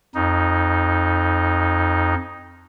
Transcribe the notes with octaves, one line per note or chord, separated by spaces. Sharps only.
F2 D#4